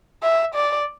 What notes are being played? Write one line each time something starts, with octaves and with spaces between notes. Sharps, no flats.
E5
D5